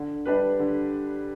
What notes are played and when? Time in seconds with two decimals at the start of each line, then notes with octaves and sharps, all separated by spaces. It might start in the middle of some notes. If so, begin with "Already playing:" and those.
Already playing: D3
0.26 G3 D4 G4 B4
0.59 D3